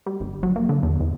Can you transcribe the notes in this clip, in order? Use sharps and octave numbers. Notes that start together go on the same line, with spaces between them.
G3
G1
F#3
A#3
D3
E2
E2